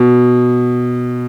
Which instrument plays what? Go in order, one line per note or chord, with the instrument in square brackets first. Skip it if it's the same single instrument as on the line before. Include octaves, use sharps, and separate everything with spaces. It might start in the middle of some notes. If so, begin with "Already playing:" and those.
Already playing: [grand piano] B2